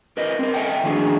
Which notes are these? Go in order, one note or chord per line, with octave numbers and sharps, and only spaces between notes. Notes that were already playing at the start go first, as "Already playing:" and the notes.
G4 A#4 B4 D#5
C4 A#4
A4 D#5 E5 F#5 G5
A2 D#3 F3 D4 F#4 G#4